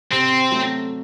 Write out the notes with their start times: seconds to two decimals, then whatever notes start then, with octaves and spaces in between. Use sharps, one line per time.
0.12 C3 C4
0.51 F#3 A3